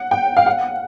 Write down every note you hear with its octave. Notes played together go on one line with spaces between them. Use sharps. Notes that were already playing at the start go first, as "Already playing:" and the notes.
Already playing: F#5
G5
F5
F#5